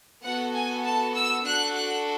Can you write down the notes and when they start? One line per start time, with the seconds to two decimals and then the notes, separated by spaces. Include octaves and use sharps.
0.23 B3 F#4 A4 F#5
0.54 G#5
0.85 A5
1.15 E6
1.46 D4 F#4 A4 F#6
1.76 F#6